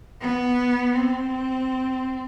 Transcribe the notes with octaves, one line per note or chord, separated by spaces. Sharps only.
B3
C4